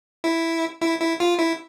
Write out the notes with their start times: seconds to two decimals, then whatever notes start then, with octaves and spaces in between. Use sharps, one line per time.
0.24 E4
0.81 E4
1.00 E4
1.20 F4
1.39 E4